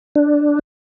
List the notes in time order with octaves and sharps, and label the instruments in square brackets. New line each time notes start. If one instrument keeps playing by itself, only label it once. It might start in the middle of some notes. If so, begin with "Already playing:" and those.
[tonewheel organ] D4